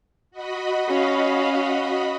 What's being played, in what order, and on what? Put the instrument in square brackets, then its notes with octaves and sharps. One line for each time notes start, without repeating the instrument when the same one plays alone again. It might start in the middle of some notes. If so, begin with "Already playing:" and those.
[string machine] F#4 D#5 B5
[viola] C#4 F5